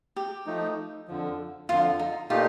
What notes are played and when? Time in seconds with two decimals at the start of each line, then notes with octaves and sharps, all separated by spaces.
0.16 G4
0.46 F3 A3 D#4
1.08 F2 D3 F3
1.69 F2 D3 F3 F4
1.99 D#4
2.30 A#2 A3 D#4 F4 G4